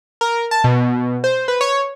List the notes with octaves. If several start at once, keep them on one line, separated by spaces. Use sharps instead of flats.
A#4
A5
B2
C5
B4
C#5